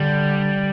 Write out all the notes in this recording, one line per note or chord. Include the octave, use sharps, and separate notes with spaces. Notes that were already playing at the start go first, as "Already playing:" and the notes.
Already playing: D3 G3